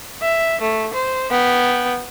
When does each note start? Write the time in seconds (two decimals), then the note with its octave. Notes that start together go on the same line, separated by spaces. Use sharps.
0.22 E5
0.61 A3
0.94 C5
1.31 B3 G5